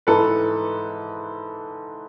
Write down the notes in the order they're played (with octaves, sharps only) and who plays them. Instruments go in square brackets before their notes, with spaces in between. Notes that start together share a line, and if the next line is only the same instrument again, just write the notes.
[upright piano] G#2 E3 A4 B4